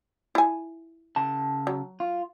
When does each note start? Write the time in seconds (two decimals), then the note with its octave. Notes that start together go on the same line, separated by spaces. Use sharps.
0.35 E4 G#5
1.16 C#3 A5
1.67 F#3
2.00 F4